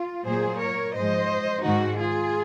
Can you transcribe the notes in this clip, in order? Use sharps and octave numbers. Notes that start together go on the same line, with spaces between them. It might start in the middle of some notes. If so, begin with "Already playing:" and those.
Already playing: F4
A#2 F#3 A#3 G#4 C5
A#4 C#5
G#2 F3 G#3 C5 D#5
G#2 D#3 G#3 D#4 F#4
F4 G#4